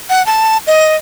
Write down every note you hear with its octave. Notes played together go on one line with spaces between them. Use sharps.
F#5
A5
D#5